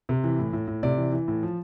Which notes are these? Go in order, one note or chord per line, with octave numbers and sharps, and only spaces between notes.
C3
E3
A2
A2
A2
C3 D5
E3
E3
A2
F3